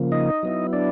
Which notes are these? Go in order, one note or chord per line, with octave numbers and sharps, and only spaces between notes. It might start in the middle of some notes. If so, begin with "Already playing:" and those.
Already playing: C#3 F3 A#3
D#4 D#5
F#3 B3 E4
D4 D5